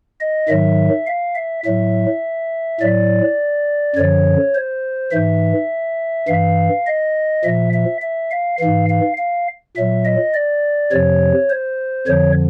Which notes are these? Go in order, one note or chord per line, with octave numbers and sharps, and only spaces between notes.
D#5
G#2 D#3 F#3 E5
F5
E5
A2 F#3 E5
A2 F#3 D5
F#2 D3 F3 C#5
C5
G#2 E3 E5
G2 E3 F5
D#5
A#2 F3 E5
E5
E5
F5
G#2 E3 F5
F5
F5
A#2 F#3 E5
D#5
D5
F2 C3 F3 C#5
C5
F2 D3 F3 C#5